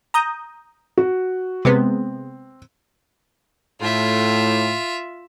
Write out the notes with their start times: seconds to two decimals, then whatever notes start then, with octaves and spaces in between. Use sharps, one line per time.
0.14 A#5 D#6 G6
0.98 F#4
1.65 C3 G#3 B3 C4
3.81 A2 F4 E5